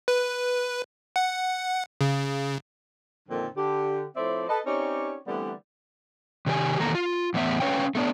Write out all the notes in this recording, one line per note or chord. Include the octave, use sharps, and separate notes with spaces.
B4
F#5
C#3
F2 A#2 D3 D#3 F3 C4
D3 G4
A2 F3 C4 C5 D5 E5
A4 B4 D#5
C4 C#4 D#4 G4 C#5 D5
D3 E3 G3 A3 B3 C4
C3 D#3 G4 G#5
E2 B2 D#3 A#3 A4 A#5
F4
E2 A2 B3 E5
C#4 B4 C#5 F5 G5
A3 B3 D4